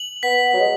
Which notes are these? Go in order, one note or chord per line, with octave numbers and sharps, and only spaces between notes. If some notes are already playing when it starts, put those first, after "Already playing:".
Already playing: F#7
B3 B6
F#3
G#3